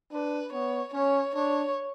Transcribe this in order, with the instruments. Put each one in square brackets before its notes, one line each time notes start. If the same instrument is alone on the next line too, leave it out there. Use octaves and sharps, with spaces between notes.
[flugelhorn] D4 [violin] B4
[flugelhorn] B3 [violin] C#5
[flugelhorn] C#4 [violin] C#5
[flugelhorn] D4 [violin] C#5